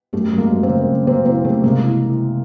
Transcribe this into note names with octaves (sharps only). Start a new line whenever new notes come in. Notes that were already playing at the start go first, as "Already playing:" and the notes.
F#2 G3 A3
F#2
G#3 A#3
F#2
A#3 C4
C#3
F#2
C#3 A#3 C4
E3 A#3 C4
C#3 G3 A3
C3 G#3 A#3
E3
E3